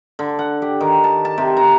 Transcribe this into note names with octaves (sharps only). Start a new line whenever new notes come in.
D3
F#5
G4
D#3
A5
A5
C3
A#5